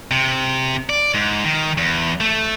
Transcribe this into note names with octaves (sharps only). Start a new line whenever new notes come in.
C3
D5
G#2
D#3
E2
A3